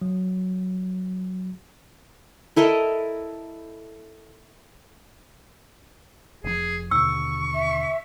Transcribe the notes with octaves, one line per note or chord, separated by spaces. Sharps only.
F#3
E4 A4 A#4 D#5
F1 B2 F3 G#4
D#2 B2 D3 C#6 E6
E5